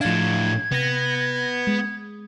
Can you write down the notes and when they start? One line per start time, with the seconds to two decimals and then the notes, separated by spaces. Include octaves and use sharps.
0.01 A2 F3 D4 F5 G#6
0.72 C3 B3 A#6
1.67 G#3